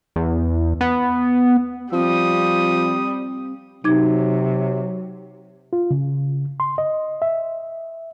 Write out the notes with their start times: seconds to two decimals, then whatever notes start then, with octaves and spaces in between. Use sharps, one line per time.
0.16 E2
0.81 B3
1.93 F3 G3 C4 D#6
3.84 C3 F#3 D#4 D6 G#6
5.73 F4
5.91 C#3
6.60 C6
6.78 D#5
7.22 E5